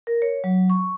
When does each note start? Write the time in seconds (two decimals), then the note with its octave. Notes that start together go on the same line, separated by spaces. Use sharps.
0.07 A#4
0.22 C#5
0.44 F#3
0.70 C#6